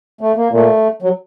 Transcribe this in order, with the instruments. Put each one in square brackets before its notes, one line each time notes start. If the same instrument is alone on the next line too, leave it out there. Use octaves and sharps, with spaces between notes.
[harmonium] A3
A#3
[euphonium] A#2 [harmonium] A3
[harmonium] F#3